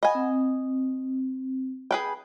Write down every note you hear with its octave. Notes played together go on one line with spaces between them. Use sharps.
D#5 F#5 G#5 B5
C4
G#4 B4 G5